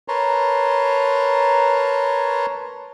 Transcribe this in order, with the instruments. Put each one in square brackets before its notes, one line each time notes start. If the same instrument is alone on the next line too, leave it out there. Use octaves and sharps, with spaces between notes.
[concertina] A#4 B4 C#5 A5 A#5 C6